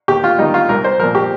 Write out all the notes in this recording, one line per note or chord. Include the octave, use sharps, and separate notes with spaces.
D#2 G4
F4
D#3 G3 D#4
F4
C2 A#4
C5
A#2 F3 A#4
G4